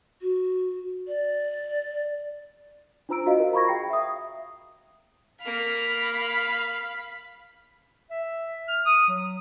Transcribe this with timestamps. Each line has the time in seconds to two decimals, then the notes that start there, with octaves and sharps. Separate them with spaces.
0.21 F#4
1.07 D5
3.09 D4 F4 C5 A#5 E6 D7
3.26 F4 F#4 D#5 F5
3.39 F#4 A#4 C5
3.53 A#5 B5 C#6 G#6 A#6
3.68 G#4 F5 G5 A#6 C7
3.90 E5 D#6
5.41 A#3 F5 B5 F6
8.10 E5
8.68 F6
8.86 D#6
9.08 F#3